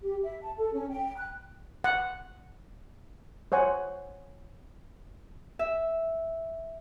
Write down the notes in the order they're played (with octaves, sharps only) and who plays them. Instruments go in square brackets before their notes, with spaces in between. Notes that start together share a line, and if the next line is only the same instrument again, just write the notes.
[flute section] G4
E5
A5
A4
C#4
G5
F#6
[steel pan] F#5
C5 C#5 F#5 G#5
[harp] E5